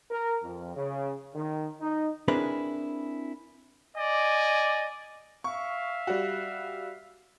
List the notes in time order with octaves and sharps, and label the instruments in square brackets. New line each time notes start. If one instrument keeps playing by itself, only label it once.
[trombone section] A#4
F2
C#3
D#3
D#4
[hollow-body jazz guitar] C4 D4 E4 G#4 A#4 B4
[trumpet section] D5 D#5 G#5
[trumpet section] E5 F5 [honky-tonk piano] C#6
[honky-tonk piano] G3 F#4